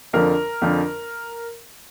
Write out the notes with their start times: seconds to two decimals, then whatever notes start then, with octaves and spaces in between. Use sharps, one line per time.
0.13 F2 D3 F3 A#4
0.62 F2 D3 F3